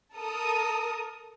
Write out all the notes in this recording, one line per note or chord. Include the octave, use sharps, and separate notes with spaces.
A4 A#4 D#6